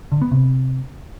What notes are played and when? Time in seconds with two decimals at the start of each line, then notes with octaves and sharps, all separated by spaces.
0.12 D3
0.22 B3
0.31 C3